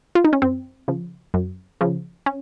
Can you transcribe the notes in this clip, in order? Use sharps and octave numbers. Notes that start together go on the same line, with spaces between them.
F4
D#4
C#4
F#2 C4
C#3 F3
F#2
C#3 F3
C#4